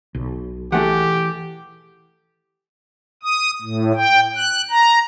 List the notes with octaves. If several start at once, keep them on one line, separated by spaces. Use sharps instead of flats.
B1
E3 A3 G4 G#4 F#5
D#6
A2
G5
F#6
A#5